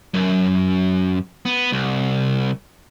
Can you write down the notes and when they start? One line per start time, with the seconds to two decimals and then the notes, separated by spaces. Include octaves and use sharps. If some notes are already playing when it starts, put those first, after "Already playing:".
0.14 F#2
1.45 B3
1.72 C2